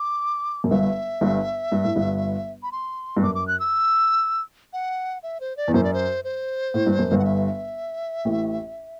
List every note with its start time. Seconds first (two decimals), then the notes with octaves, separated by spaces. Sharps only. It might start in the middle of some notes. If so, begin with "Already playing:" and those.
Already playing: D6
0.64 F#2
0.71 G1 G2 E5
1.21 G1 G2
1.72 G2
1.84 A2
1.96 G1 G2
2.63 B5
2.72 C6
3.17 G2
3.22 F#2 D6
3.35 D6
3.48 F#6
3.60 E6
4.73 F#5
5.23 E5
5.40 C5
5.57 D5
5.68 E2
5.74 F#2 C5
5.84 D5
5.93 C5
6.24 C5
6.74 A2
6.87 G2
6.99 F#2
7.11 G1 G2
7.19 F#5
7.25 E5
8.25 A1 A2